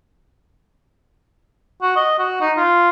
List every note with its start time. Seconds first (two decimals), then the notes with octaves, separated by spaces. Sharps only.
1.82 F#4
1.96 D#5
2.19 F#4
2.40 D#4
2.57 F4